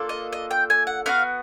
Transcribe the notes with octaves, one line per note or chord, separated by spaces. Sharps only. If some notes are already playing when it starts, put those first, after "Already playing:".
Already playing: A#3 D4 F4 A4
D#5
D#5
G5
G#5
F#5
B3 D#4 F#4 F5